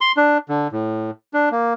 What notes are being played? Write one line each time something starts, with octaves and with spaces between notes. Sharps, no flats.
C6
D4
D3
A2
D4
A#3